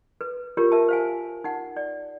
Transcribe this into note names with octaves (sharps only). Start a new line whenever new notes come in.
B4
F4 G4 A#4 C#5
A#4 E5 A5
C5 F5 G#5
D#4 F#5
D5